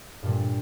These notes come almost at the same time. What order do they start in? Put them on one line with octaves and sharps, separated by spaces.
G2 A#2 G3